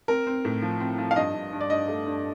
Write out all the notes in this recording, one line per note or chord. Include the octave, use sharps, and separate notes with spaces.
C4 A#4
C4
A2
F3
C4
F3
F5
G2 D#5
G2
G2
D5
G2 D#5
A3
G2